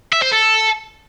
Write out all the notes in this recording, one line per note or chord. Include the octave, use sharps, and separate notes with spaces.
E5
C5
A4